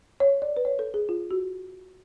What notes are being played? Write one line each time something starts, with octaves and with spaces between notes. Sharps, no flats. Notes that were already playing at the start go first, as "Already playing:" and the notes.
C#5
D5
B4
C#5
A4
G#4
F4
F#4